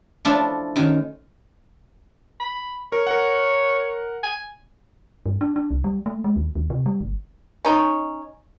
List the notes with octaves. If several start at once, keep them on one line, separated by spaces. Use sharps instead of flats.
F3 A3 D4 E4 F4
F#2 D#3
B5
A#4 C#5
A#4 F#5
G#5
G2
D4
D4
C2
G3
A3
G#3
D#2
D#2
C3
G3
G1
C#4 D#4 C#5